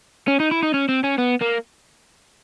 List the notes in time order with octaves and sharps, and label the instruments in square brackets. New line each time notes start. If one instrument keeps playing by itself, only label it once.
[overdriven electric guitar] C#4
D#4
E4
D#4
C#4
C4
C#4
B3
A#3